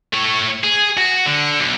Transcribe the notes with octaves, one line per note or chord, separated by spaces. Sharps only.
A3 C#5
G#4
F#4
D3
B1